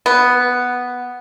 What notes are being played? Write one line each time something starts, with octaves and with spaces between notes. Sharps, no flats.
B3